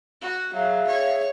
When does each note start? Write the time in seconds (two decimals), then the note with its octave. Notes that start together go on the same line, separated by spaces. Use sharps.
0.22 F#4
0.54 F#3 G#4 E5 F5
0.87 C#5